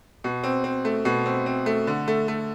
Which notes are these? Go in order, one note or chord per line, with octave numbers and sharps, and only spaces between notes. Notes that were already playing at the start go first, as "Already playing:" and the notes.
B2
C4
C4
A3
B2
C4
C4
A3
D3
A3
A3